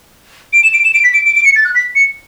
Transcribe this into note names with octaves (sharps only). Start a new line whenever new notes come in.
D7
E7
D7
E7
D7
B6
D7
D7
D7
C#7
A6
F#6
B6
C#7